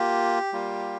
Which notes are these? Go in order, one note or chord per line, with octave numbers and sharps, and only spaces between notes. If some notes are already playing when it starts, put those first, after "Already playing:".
Already playing: A#3 F4 G4
G3 A#3 F4